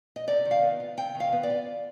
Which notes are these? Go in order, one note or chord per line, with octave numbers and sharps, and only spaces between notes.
D#5
C3 D5
D#3
F5
B3
F4
C3 G5
D#3
F5
B3
D5
F4